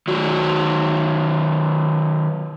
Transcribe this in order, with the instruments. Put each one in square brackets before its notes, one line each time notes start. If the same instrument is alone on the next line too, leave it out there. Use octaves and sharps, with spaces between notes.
[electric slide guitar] D#3 F#3 D#4 F#4